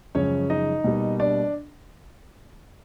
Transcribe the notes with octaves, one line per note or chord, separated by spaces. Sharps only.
F#2 C#3 F3 G#3 C#4 C#5
D#4 D#5
B2 G3 A#3
D4 D5